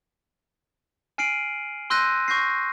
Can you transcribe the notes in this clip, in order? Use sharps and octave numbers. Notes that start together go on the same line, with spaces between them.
G#5 F6 C7 D7 D#7 F#7
C6 E6 F#6 G6 A#6 D#7
C#6 G6 A#6 C7